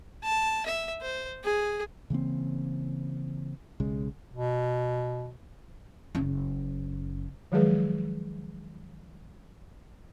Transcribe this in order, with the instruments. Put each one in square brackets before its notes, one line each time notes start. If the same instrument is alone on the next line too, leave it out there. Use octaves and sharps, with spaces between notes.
[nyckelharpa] A5
E5
C5
G#4
[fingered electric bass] C#3 E3 A#3 C4
B1 C#3 G#3
[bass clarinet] B2
[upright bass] F#1 C#4
[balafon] D#3 F3 F#3 G#3 G#4 B4